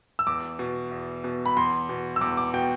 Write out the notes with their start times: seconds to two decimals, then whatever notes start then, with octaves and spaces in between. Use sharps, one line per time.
0.19 E6
0.27 E2 D6
0.59 B2
0.91 E2
1.24 B2
1.46 B5
1.57 E2 C6
1.89 B2
2.16 E6
2.21 E2 D6
2.37 D6
2.54 B2 G5